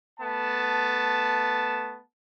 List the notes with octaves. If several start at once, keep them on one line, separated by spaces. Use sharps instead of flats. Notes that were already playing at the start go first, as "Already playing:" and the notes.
A3 B3 A5